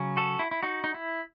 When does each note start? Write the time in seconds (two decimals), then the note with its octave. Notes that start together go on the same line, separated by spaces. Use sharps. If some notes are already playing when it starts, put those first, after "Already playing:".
Already playing: C#3 F#3 C#4
0.17 F#4 A4
0.39 E4
0.51 E4
0.63 D#4 F#4
0.84 D#4
0.94 E4